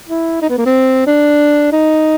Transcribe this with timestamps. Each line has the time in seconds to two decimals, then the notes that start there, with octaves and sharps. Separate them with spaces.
0.09 E4
0.42 D#4
0.49 B3
0.58 A#3
0.66 C4
1.07 D4
1.72 D#4